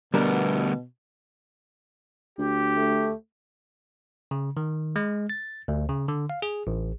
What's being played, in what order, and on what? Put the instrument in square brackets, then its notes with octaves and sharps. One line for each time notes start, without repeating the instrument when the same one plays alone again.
[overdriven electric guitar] D2 B3 [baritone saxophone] B2 [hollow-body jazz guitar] G3 D4 A#4
[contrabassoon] D2 [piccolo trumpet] G4
[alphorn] A3
[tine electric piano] C#3
D#3
G#3
A6
D2
C#3
D3
F5
G#4
A1